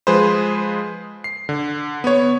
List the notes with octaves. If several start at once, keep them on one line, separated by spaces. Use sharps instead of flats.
F3 G#3 G#4 B4 C5
C7
D3
B3 C#5